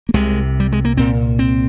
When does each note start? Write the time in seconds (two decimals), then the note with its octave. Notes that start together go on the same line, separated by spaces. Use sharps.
0.09 A#3
0.14 C2 C3 G#3
0.60 G3
0.72 G#3
0.85 A#3
0.97 C2 A#2 C4
1.39 C4